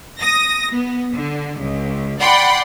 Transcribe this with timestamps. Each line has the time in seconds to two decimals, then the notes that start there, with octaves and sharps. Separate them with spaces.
0.20 D#6 A#6
0.72 B3
1.14 D3
1.58 C#2
2.21 D5 F#5 G5 B5 C6